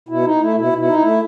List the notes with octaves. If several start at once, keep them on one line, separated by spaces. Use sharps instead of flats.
B2 E4
D#4
A3 E4
B2 E4
B2 E4
D#4
A3 E4